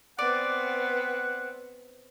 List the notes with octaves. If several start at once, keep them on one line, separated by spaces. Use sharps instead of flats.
B3 C4 D5 F#5